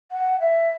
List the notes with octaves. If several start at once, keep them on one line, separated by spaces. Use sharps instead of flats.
F#5
E5